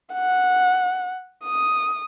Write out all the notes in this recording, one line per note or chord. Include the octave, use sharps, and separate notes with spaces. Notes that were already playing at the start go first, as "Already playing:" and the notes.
F#5
D#6